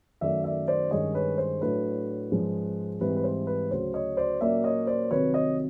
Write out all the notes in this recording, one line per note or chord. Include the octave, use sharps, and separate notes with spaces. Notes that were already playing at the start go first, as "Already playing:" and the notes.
F#2 D#3 F#3 A3 D5 E5
D5 E5
C5 D5
G2 D#3 G#3 C#4 C#5 D#5
B4 C#5
C5
A2 F#3 A3 D4 B4
G#2 F3 G#3 C#4
G#2 E3 G3 C4 B4
B4
C5
B4
D2 C#3 F#3 C5
C#5 D#5
C5 D5
A#2 F#3 A#3 C#4 D5 E5
C#5 D#5
C5 D5
C2 C3 D#3 F#3 B4 C#5
C#5 D#5